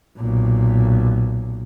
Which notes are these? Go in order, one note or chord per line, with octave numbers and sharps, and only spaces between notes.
B1 A#2